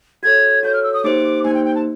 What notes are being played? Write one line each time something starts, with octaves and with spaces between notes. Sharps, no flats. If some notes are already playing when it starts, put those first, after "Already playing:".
F#4 A4 C#5 G#6
F#4 A4 C#5 G6
F6
E6
D#6
A#3 D#4 G4 C5 D6
A#3 D#4 G4 C5 G#5
G5
G5
A5